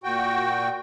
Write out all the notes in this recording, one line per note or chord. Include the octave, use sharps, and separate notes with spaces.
A#2 F#4 G5